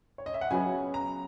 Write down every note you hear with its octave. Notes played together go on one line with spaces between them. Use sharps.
C#5
D#5
E5
F#5
C#3 F#3 B3 G#5
A#5